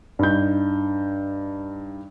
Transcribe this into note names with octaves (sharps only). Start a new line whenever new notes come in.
G2 D#4 G6